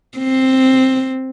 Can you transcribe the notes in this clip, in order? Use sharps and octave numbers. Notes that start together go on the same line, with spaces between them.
C4